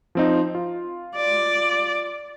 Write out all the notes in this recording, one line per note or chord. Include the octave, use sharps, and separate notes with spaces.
F3 C4 D#4
F4
D5